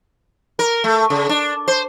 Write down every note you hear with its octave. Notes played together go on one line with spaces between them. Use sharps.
A#4
A3
C#3
D4
C5